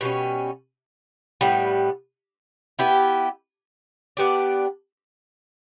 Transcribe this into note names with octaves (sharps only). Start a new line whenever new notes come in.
B2 G3 C#4
A2 G3 B3
B3 E4 G4
B3 D4 G4 D5